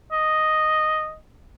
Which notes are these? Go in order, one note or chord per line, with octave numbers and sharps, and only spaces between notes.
D#5